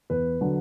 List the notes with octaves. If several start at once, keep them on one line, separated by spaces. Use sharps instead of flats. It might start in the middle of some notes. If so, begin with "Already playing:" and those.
E2 B4
D3 F#3